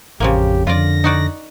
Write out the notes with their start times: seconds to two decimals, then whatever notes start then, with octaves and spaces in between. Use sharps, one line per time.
0.20 A1 F2 C#3 F3 A#3 G4
0.67 F2 D3 F4 D5 A#6
1.04 D#4 F#4 D5